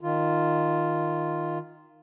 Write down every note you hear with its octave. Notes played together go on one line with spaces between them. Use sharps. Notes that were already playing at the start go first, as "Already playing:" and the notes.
D#3 F4